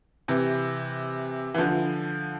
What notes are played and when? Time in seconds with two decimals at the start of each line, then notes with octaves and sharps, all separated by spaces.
0.28 C3 E3
1.54 E3
1.58 D3 F3